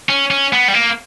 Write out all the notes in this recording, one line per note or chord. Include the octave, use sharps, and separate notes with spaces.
C#4
C#4
B3
G3
A#3